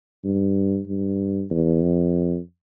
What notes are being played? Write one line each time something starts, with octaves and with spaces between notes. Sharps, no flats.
G2
G2
E2
F2